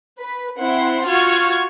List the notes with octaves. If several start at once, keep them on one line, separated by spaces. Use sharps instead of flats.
B4
C4 E4 F#5 C6
F4 F#4 C#6 F6 G#6